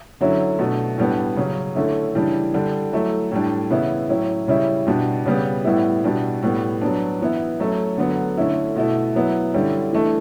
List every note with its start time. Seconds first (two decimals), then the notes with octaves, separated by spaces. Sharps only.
0.21 D3 F#3 C#4 E4
0.59 B2 A3 D4
0.98 A2 G3 B3 D4
1.36 C#3 F#3 C#4
1.75 D3 A3 C#4 E4
2.15 C#3 E3 G3 D4
2.54 D3 G3 D4
2.92 F#3 A3 E4
3.31 A2 G3 D4
3.70 C#3 E3 B3 E4
4.09 A2 F#3 C#4 E4
4.48 C#3 G3 C#4 E4
4.87 B2 G3 D4
5.26 C#3 G3 B3
5.65 A2 G3 B3 E4
6.04 B2 G3 D4
6.42 A2 G3 B3
6.81 F#3 B3 D4
7.21 E3 B3 E4
7.60 F#3 A3 C#4
7.98 D3 F#3 B3
8.37 D3 A3 C#4 E4
8.76 B2 A3 E4
9.15 F#3 B3 E4
9.53 D3 G3 C#4 E4
9.93 E3 A3 D4